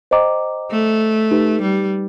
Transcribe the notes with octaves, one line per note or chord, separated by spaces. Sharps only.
C5 D#5 G5 A#5 D6
A3
D#4 G4 B4
G3